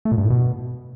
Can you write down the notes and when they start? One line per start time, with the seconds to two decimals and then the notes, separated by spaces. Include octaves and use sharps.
0.05 A3
0.12 A#2
0.18 G2
0.24 A2
0.30 B2